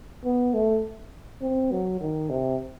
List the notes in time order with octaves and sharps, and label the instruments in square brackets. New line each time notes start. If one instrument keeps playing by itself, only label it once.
[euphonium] B3
A3
C4
F#3
D#3
C3